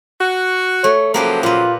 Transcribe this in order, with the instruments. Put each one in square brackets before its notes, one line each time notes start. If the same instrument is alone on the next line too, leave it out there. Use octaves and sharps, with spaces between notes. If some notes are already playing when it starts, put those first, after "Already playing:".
[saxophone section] F#4
[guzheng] A3 [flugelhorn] C#5
[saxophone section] C#3 F3 F#3 [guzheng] A#3 G4 B4 [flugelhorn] A4
[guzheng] A#2 B4 [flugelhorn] F4